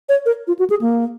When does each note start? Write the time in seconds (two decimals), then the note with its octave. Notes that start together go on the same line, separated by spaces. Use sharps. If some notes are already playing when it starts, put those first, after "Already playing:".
0.09 C#5
0.26 A#4
0.47 F4
0.59 F#4
0.70 G#4
0.81 A#3